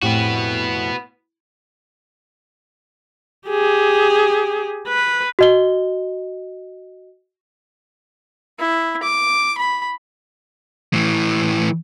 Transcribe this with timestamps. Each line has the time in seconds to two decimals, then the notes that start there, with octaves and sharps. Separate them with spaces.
0.02 F2 A2 B3 F#4 G4
3.48 G4 G#4
4.88 B4
5.39 F#4 D#5 G7
8.59 E4
9.03 D6
9.58 B5
10.93 A2 E3